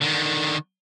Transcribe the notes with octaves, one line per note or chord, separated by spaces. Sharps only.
D3 D#3